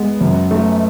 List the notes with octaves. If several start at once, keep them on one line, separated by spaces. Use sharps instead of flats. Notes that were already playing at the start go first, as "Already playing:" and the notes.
Already playing: G#3 B3
F#2
A3